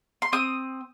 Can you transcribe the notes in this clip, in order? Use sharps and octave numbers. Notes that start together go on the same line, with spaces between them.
C6
C4 D#6